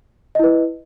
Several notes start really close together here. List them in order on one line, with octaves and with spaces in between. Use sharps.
D#5 E4 B4